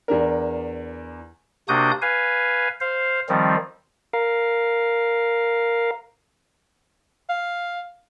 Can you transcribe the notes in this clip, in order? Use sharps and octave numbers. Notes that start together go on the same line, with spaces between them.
E2 D4 A#4
C3 A#3 D4 F#4 D#6 G6
B4 F5 G#5
C5 F5
D#3 F3 G3 C4
A#4 F5
F5